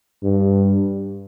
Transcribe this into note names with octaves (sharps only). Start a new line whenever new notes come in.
G2